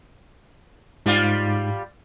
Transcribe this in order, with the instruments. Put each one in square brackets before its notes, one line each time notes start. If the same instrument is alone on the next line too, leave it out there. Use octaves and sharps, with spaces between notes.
[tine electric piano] G#2 [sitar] G3 F4